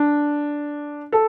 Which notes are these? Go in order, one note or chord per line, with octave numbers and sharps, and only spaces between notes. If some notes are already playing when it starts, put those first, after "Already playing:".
Already playing: D4
A4